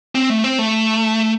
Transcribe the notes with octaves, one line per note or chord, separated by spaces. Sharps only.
C4
A3
C4
A3